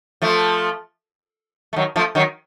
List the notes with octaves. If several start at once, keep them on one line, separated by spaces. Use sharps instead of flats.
F3 A3
A3
D#3 F#3
F3 A3
D#3 F#3